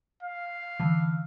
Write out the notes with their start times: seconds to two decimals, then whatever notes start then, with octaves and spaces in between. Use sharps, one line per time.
0.23 F5
0.80 D3 E3